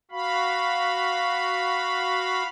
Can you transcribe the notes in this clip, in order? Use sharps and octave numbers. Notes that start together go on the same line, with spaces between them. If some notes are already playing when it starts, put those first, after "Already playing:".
F#4 F5 B5